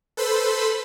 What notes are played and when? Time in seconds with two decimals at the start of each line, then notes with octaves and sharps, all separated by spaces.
0.17 A4 B4 C5 B5 C6 E6